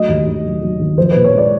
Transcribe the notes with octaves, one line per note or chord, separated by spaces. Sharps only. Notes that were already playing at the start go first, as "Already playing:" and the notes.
Already playing: F#3 A3 D#5
D#2
D#3
F#3
F#3
D#3
F3 C5
A#2 B4
C#5
G#3 D5